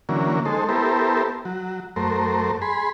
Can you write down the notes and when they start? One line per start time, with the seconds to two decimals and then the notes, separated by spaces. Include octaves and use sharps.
0.09 D3 E3 F#3 A#3 C#4
0.45 G#3 D#4 A4 C5
0.69 B3 E4 G4 A4 A#4 C5
1.45 F#3
1.96 F#2 A3 A#4 C5
2.62 G#4 B5 C6